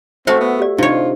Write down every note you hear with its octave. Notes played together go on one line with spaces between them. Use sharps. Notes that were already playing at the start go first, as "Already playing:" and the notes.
A3 C4 F#4 C5 E5 F5
B3
G4 D5
C3 D4 D#4 F4 C#5